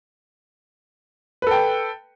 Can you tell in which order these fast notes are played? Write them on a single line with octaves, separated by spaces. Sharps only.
B4 A4 G5